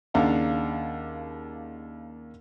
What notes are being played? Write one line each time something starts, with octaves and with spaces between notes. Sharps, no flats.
D#2 C#3 D4 F5 F#5 A#5